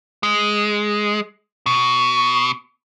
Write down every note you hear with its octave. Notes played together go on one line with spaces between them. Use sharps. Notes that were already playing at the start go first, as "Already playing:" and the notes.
G#3
B2